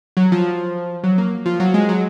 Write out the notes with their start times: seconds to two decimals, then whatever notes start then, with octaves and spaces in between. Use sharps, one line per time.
0.17 F#3
0.32 F3
1.04 F#3
1.18 A#3
1.46 F3
1.60 F#3
1.74 G#3
1.89 F#3